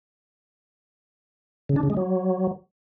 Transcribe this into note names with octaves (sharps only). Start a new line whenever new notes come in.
C#3
D4
C#3
G#3
F#3